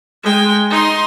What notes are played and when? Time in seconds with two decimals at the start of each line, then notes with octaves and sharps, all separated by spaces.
0.23 G#3 G5
0.70 D#4 C6